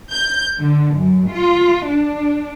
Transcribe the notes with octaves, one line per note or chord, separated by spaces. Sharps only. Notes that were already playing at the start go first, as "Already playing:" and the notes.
G6
D3
F#2
F4
D4